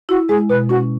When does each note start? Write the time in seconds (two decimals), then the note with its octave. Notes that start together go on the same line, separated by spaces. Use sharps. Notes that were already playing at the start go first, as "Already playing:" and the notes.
0.09 E4 F#4
0.29 G#3 G#4
0.50 B2 B4
0.69 C#4 F#4